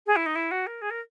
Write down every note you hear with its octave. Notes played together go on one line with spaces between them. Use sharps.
G#4
E4
D#4
E4
F#4
A#4
G#4
A#4